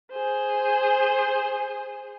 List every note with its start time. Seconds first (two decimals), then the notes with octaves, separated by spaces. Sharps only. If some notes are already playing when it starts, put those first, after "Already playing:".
0.12 G#4 C5